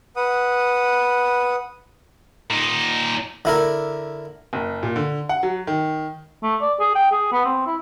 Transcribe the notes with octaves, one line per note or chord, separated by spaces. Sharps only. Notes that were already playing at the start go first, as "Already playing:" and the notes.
B4 F#5 D#6
A#2 D#4
D3 E4 A#4
F#1
A#2
D3
F#5
F#3
D#3
A3
D5
G#4
G5
G#4
B3
C4
E4